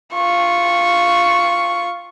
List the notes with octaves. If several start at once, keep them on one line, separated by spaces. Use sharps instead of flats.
F4 C#6